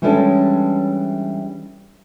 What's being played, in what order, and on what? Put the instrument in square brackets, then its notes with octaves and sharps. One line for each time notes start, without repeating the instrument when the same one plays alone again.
[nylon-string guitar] E3 G3 G#3 C#4 D4 A4